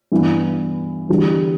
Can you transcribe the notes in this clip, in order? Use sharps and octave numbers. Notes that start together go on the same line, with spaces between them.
G2 E3 B3
E2 D3 G3